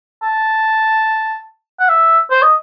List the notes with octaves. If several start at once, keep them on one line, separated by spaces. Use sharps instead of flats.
A5
F#5
E5
C5
D#5